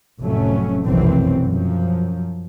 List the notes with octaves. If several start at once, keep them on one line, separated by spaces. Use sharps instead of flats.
F1 F2 A2 F#3 A3 C#4
F1 B1 F#2 E3 F#3 C4
F#2 F3